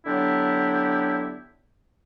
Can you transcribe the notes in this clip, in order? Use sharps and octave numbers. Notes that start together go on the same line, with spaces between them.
D3 F#3 B3 D4 E4 G4